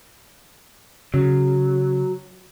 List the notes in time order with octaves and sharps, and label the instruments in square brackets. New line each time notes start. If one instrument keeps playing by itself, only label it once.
[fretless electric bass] C#3 [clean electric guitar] F#3